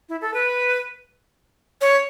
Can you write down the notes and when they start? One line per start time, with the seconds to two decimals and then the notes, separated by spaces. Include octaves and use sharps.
0.09 E4
0.21 A4
0.34 B4
1.81 C#5